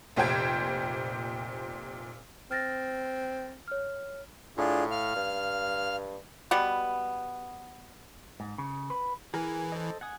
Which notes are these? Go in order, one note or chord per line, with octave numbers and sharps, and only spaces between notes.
F1 A#2 G4 C5 G5 G#6
C4 F6 A6 A#6
C#5 F6
A2 D4 F4 G#4
F5 F6
G2
B2 G3 B3
G#2
C#3
B4
E3 G#4 A#4 G#5
A4 C5 D#5
F#5 G#5 D#6